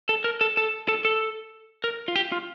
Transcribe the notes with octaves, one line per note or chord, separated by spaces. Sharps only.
A4
A#4
A4
A4
A4
A4
A#4
F4
G4
F4